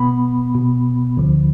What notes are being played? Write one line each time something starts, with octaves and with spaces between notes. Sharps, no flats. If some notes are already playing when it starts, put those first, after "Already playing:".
Already playing: B2 B3 B5
B2 B3
D2 D3 F3